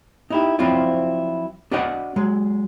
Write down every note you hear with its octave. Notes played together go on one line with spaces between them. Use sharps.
D#4 E4 G4
F3 F#3 C4 D4 E4 F4
D4 F#4 B4 D5 D#5 F#5
F#3 G#3